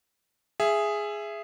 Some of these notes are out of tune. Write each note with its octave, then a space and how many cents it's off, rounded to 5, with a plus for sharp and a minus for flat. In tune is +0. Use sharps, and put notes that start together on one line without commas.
G#4 +0 E5 +20